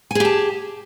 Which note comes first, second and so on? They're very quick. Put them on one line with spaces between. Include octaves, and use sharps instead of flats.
G#5 G#4 G4 A5